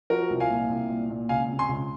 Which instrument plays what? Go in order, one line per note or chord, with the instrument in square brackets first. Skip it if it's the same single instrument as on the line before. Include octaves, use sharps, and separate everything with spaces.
[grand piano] F3 F#4 A#4
C2
F5 G#5
A#2
C2
A#2
A#2
C#2 F5 G#5
C3
G#5 C6
C#2